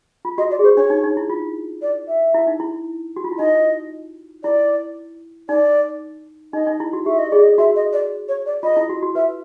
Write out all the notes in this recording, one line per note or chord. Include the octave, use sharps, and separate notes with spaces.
F4
F#4 D#5
D5
G#4
G4 C5
D4 C#5
D#4
D#4
E4
F4
D5
E5
E4
D#4
E4
F#4
F4
E4
D#4 D#5
E4 D5
D#4 D5
D#4 D#5
D#4
E4
F#4
G4 E5
D#5
G#4 D5
D#5
F#4 E5
D#5
D5
C#5
D5
F4 D#5
E4
F#4
F#4
B4 E5